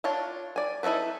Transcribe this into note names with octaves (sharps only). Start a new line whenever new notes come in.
D4 F4 C#5 A5
D5 G#5
D#4 E4 F#4 A4 B4